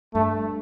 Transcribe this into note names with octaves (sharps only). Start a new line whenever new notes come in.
G2 A3